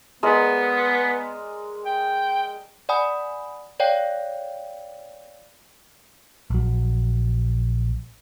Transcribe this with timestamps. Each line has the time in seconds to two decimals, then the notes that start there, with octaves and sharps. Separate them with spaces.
0.23 G#3 B3 A#4 D5
1.86 G5
2.89 D5 F#5 G#5 B5 D#6
3.80 C#5 D5 F5 G5
6.50 A#1 F#3